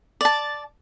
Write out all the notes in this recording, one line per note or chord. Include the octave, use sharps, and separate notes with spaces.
D5 A5